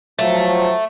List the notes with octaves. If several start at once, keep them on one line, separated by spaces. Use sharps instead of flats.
F3 F#3 A3